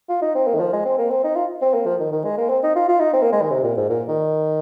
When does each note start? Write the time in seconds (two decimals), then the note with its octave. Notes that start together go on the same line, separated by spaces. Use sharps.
0.09 F4
0.22 D#4
0.35 C4
0.47 A#3
0.55 D#3
0.60 F3
0.73 G#3
0.85 C4
0.98 A#3
1.10 C4
1.24 D#4
1.36 F4
1.62 C4
1.74 A#3
1.86 F3
2.00 D#3
2.12 D#3
2.24 G#3
2.38 A#3
2.49 C4
2.63 D#4
2.76 F4
2.89 F4
3.00 D#4
3.14 C4
3.23 A#3
3.32 G#3
3.42 D#3
3.51 C3
3.63 A#2
3.77 G#2
3.90 A#2
4.08 D#3